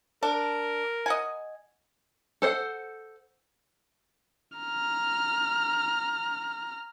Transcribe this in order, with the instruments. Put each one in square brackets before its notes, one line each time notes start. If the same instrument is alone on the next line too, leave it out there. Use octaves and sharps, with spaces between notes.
[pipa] D4 [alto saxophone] A#4
[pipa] D#5 F#5 G#5
[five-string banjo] A4 C5 F#5
[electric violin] A#5 F6